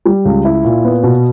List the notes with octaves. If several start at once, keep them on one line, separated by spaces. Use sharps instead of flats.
G3
C#2
E4
A#2
B3
B2